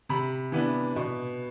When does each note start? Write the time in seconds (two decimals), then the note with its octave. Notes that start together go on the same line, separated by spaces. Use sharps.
0.09 C3 B5
0.52 E3 B3 D4
0.96 B2